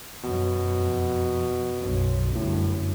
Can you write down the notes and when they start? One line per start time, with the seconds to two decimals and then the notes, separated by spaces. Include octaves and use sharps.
0.23 F#2 B2
0.75 F2
1.79 B1 F#2
2.35 G1 F#2 A2